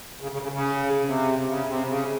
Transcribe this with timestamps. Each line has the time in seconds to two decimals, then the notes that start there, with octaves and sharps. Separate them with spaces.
0.21 C#3
0.32 C#3
0.42 C#3
0.52 C#3
1.05 C3
1.48 C#3
1.68 C3
1.89 C#3